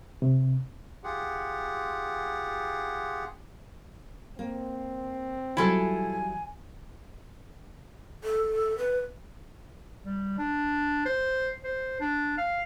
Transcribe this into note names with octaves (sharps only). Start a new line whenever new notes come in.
C3
F4 G4 G#4 F#5
A#3 C4
E3 F#3 G3 E4 F4 A4 G#5
A4
B4
G3
D4
C5
C5
D4
F5